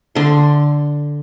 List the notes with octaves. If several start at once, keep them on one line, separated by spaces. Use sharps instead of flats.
D3 C6